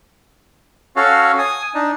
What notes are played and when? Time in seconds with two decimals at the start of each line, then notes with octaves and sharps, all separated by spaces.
0.96 C#4 F#4 A4 C#5 F5
1.38 G#5 D#6
1.74 D4 D#4